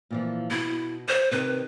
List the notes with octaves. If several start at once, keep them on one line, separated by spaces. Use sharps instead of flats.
A#2 E3 F3
B2 E4
C5
C3 D#3 B4